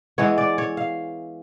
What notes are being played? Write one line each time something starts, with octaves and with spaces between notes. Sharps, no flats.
E3 G#3 B3 C#5
D5
C#5
F5